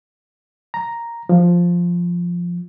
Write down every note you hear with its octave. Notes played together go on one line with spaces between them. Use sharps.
A#5
F3